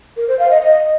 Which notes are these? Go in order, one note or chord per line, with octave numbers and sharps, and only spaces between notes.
A#4
C5
F5
D#5
D#5